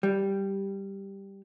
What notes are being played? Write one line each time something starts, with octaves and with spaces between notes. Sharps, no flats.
G3